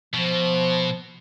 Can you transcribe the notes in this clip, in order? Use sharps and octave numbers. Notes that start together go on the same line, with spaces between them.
B2 F3